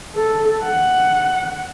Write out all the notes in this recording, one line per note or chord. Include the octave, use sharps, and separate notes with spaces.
A4
F#5